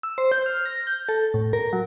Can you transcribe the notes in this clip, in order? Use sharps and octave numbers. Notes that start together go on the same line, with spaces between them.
E6
C5
G6
F6
A#6
G6
A4
A2
A#4
F#3